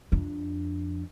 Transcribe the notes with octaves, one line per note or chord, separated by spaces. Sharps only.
F2 D4